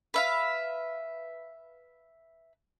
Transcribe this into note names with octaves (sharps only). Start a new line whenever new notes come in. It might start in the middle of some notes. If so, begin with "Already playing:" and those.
B4 E5 F5